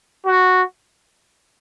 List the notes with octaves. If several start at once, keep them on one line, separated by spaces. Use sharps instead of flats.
F#4